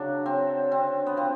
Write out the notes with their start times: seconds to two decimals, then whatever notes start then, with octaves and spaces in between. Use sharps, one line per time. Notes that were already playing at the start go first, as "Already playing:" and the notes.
Already playing: C#3 F#3 D4
0.26 F#3 C4
0.71 D3 C4
1.06 B3
1.17 F3 C4